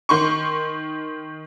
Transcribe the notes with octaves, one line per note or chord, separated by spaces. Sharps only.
D#3 C6 C#6